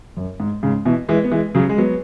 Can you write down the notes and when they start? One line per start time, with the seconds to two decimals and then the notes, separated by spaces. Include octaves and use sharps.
0.17 F#2
0.40 G#2
0.63 G#2 C#3
0.85 B2 E3
1.09 E3 G#3
1.24 B3
1.31 E3 G#3
1.55 C#3 F#3
1.69 G#3
1.78 F#3 B3